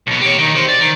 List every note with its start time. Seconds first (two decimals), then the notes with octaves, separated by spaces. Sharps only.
0.07 B1 B2
0.21 G4 C#5
0.39 D#3
0.55 G4 C5
0.69 D5
0.81 D#3